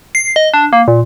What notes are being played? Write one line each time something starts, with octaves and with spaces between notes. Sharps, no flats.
C7
D#5
D4
A#3
A#2